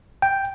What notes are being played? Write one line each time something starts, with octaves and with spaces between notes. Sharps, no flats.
G5